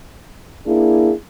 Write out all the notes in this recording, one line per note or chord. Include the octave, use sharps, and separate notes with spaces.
A#3 D4 E4 G#4